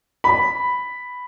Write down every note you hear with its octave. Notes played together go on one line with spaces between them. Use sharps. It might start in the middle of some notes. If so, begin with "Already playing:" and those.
B5